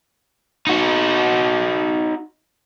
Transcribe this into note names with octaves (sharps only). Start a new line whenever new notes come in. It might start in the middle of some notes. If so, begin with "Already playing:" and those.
D#4 F#4